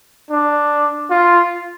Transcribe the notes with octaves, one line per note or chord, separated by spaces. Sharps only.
D4
F4